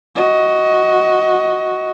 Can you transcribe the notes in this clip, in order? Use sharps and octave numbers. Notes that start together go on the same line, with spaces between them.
F#4 D#5